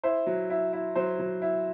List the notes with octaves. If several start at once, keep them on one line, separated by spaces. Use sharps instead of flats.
E4 C5
F#3
E4
E4
F#3 C5
F#3
E4